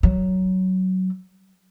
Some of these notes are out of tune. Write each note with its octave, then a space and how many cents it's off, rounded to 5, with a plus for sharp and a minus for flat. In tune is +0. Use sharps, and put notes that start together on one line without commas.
F#3 +10